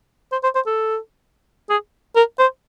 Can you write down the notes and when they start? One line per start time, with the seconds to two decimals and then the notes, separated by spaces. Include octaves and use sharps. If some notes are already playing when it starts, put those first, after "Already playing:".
0.32 C5
0.43 C5
0.55 C5
0.66 A4
1.70 G#4
2.16 A#4
2.39 C5